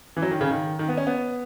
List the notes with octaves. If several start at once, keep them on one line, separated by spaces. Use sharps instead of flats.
E3
F#3
D#3
C#3
D#3
D#3
B3
C#4
B3